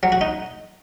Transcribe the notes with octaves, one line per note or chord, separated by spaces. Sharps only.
F#3
F#4
D#4